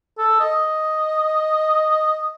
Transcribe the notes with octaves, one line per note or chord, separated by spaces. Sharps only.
A4
D#5